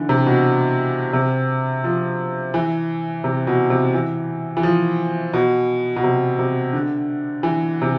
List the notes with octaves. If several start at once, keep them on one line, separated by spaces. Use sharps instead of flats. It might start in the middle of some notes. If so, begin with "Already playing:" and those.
Already playing: D3 E3
C3
B2
C3
F3
E3
C3
B2
C3
E3
E3
F3
B2
B2
C3
C3
D3
E3
C3